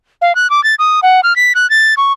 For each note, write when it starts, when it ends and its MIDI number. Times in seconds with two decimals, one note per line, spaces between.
0.22 0.35 77
0.35 0.50 90
0.50 0.63 86
0.63 0.75 93
0.79 1.00 87
1.03 1.20 78
1.23 1.36 89
1.36 1.53 95
1.55 1.69 90
1.70 1.94 93
1.97 2.12 85